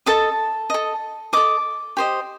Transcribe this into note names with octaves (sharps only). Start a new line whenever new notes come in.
A4 D#5 A5
A4 D#5
A4 D#5 D6
G4 C5 D#5